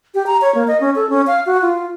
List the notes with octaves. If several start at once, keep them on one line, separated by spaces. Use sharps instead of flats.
G4
A#5
C#5
A#3
D#5
C#4
A4
C#4
F5
F#4
F4